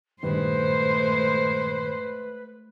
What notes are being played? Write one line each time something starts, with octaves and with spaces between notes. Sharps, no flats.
G2 A#2 D#3 G#3 A3 B4 C5